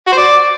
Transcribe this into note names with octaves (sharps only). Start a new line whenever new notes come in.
F#4
C5
D5